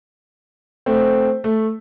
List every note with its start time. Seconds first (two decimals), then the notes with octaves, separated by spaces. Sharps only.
0.86 A3 C4
1.44 A3